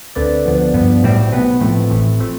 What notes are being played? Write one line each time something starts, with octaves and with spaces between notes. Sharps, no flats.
D2 D3 A3 C4 B4 D5
D2 D3 F3 B3
G2 F3 B3
B1 A2 G3 C4
B1 B2 B3 B4
A2 F3 A3 C4
A1 A2 E3 A3 C4
F3 A3 C4